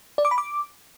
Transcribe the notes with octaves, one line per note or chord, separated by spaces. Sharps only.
D5
D6
B5
D6